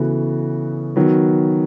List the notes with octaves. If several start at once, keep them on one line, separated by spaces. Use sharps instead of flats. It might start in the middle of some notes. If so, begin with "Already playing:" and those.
Already playing: C#3 E3 B3 F#4 A4
D#3 F#3 B3